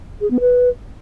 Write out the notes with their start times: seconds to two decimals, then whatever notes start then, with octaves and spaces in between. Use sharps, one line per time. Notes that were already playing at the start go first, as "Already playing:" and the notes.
0.21 G#4
0.31 B3
0.40 B4